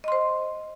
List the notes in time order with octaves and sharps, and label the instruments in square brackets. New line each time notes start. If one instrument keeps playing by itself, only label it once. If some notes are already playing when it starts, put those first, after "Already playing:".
[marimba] D#5
C6
C5